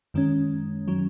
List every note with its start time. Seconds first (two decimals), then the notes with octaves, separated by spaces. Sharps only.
0.14 F#2 D#3 G#3 C#4
0.88 D#3 F#3 C#4